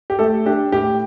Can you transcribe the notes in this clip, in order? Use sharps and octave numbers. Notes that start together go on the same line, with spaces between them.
G4
A3 A4
D4 G4
A2 G4